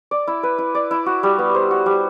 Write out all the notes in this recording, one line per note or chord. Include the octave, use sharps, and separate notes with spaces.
D5
E4
B4
E4
D5
E4
F#4
G3
B3
C5
F#4
G3